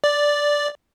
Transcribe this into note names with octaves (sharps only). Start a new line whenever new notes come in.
D5